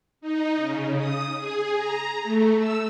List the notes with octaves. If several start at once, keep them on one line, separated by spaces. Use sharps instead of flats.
D#4
C#3
D#6
G#4
A#5
A3
E6